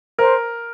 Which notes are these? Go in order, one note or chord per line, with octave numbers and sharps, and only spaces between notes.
A#4 C5